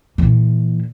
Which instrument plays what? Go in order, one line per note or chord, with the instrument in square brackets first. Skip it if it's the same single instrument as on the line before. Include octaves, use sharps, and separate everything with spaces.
[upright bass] A#2 E3